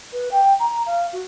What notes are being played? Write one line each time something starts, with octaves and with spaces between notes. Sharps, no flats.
B4
G5
A#5
F5
F#4